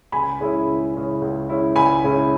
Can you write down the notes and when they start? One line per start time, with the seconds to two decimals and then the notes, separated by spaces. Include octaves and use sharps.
0.12 C#2 G#5 B5
0.40 C#3 G#3 C#4 E4
0.67 C#2
0.94 C#3 G#3 C#4 E4
1.22 C#2
1.49 C#3 G#3 C#4 E4
1.76 C#2 G#5 B5
2.04 C#3 G#3 C#4 E4